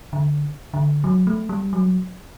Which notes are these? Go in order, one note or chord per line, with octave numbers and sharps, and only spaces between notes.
D3
D3
F#3
A3
G3
F#3